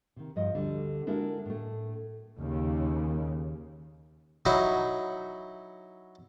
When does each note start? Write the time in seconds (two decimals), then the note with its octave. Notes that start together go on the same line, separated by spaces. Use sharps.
0.16 C3 D#3
0.36 G2 F3 D#5
0.53 D2 D3 G3
1.07 G#3 D4 E4 F#4 A4 A#4
1.45 A2 A3
2.39 D#2 C#3
4.46 F#3 D#4 E4 F#4